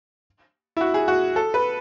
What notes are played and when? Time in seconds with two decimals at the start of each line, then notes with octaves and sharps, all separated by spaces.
0.77 E4
0.81 F#4
0.94 G#4
1.08 F#4
1.36 A4
1.54 B4